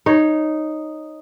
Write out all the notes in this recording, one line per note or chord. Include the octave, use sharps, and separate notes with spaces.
D#4 C#5